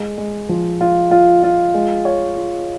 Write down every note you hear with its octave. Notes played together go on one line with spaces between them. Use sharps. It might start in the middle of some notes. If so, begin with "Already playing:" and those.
Already playing: G#3
G#3
F3
F4
F4
F4
G#3
C#5
F4